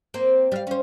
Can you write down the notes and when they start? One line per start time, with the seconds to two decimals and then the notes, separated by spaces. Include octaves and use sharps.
0.14 A#3 C4
0.52 G3 F5
0.67 C#4 C5